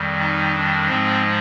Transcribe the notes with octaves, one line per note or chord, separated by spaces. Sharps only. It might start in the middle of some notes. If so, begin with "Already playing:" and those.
Already playing: F2 D#3 G3
D#4
D4
G#2 F3 G#3 C4